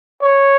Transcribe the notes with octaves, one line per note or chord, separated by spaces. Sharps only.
C#5